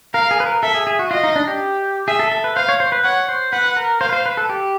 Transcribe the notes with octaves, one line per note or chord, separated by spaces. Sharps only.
A#4 F5
G#4
B4
A#4
A4 E5
G#4
G#4
F#4
F4 D#5
D#4
D4
G4
G#4 E5
A4
A4
B4
C5 F5
C#5
C5
B4
C#5 F#5
C5
B4 F#5
A#4
C5 F5
B4
C5
B4
A4
G4